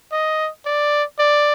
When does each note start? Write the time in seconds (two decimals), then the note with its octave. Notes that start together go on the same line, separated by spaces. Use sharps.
0.12 D#5
0.66 D5
1.19 D5